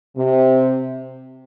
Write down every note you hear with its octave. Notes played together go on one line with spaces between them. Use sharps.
C3